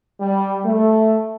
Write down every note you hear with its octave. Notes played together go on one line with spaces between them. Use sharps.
G3
A3